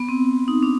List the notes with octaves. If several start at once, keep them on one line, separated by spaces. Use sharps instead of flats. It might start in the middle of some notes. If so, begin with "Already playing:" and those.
Already playing: B3
C4
D#4
D4